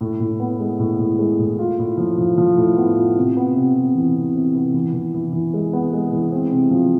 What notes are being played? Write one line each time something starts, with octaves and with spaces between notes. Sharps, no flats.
A2
A2
B3
G#3
A2
A2
G#3
A2
F4
A2
F3
F3
F3
A2
B3
F4
C3
B3
C3
C3
E3
C3
C3
B3
E3
E3
E3
E3
G#3
B3
G#3
E3
C4
C3
F3